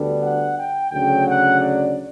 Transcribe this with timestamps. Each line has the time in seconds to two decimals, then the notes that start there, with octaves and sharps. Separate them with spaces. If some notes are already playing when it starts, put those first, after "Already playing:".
Already playing: D2 D3 G3 B3 D4
0.21 F#5
0.56 G5
0.91 D2 C#3 F#3 G5
1.25 F#5
1.60 D5